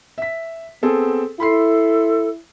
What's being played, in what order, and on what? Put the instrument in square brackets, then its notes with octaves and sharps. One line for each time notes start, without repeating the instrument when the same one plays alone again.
[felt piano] E5 B6
[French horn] B3 [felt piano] C4 G#4 A4
[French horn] E4 [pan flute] A4 [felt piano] B5 C6 C7